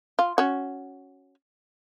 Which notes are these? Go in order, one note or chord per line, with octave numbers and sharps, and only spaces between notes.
F4
C#4 F#4